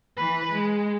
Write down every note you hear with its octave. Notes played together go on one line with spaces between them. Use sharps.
E3 B4
G#3